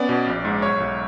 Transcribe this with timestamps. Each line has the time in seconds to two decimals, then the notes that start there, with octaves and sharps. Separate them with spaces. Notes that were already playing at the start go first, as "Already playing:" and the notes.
Already playing: B3 C#4 D5
0.09 B2
0.27 A#1
0.45 G#2
0.62 B1 C#5
0.80 B1